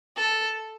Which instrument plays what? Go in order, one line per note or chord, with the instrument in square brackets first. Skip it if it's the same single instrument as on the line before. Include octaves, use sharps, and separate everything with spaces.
[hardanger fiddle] A4